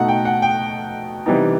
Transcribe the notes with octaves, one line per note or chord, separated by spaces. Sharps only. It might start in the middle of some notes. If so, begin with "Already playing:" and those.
Already playing: B2 A3 D#4 F#5
G5
F#5
G5
C3 E3 G3 B3 D#4